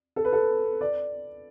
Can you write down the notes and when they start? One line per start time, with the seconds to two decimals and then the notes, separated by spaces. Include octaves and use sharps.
0.16 A4
0.24 B4
0.33 A4
0.81 D5